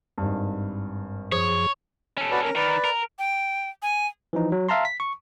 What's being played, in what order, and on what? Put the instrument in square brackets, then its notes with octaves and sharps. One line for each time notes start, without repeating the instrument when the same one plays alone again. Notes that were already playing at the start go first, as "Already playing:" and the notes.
[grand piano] G#1 G2
[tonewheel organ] F#2 F3 G#4 [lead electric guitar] C#5
[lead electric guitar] C#4 A4
[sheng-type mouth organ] F#4 B4 D5
A#4
[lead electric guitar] D#3 A#4 [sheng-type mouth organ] B4 D5
[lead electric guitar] A#4
[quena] G5
G#5
[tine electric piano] E3 F3 D#4
F#3
E5 F5 A5 A#5 C6
B6
C#6